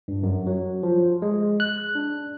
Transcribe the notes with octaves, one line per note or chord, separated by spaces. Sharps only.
G2
F#2
F#3
F3
G#3
F#6
D4